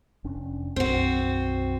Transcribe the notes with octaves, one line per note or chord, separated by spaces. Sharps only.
F1 C#4 D4
B1 F#2 C4 F#4